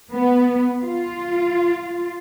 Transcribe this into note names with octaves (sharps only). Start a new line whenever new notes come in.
B3
F4